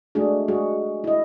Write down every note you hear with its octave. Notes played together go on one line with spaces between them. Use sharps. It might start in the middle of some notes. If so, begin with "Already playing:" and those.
G#3 A3 D4 F#4 G#4
G#3 F#4 G#4
E4 D#5